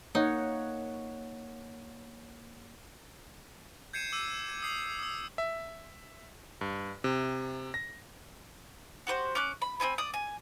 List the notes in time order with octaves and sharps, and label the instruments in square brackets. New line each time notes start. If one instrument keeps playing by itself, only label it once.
[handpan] A#3 C#5 F#5 [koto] D#4
[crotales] G6 G#6 C7 C#7 D#7 E7
D6 E6 D#7
G#6
D#6 C7
D#6 E6
[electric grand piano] E5
G2
C3
A#6
[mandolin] F#4 G4 B4 C5
C#4 D6 F#6
B5
C4 E4 G#5 B5
D5 D#6
G#5